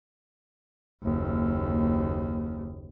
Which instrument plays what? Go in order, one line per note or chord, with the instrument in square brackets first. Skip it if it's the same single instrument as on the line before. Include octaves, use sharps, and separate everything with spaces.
[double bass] F#1 D#2